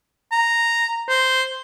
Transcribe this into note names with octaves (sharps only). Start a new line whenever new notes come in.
A#5
C5